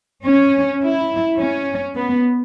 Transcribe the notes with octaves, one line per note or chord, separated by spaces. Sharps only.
C#4
E4
C#4
B3